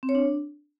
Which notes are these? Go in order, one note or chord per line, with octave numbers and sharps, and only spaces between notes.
C4
C#5
D4